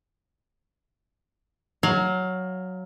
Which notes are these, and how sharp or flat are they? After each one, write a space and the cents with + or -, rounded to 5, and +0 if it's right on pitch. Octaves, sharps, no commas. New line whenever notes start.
F#3 +0 F5 +15